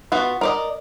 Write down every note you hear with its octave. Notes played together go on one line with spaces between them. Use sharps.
B3 F4 F#4
A#4 D5 D#5